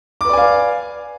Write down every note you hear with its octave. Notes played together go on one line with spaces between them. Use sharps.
B4 D5 F5 G#5 D6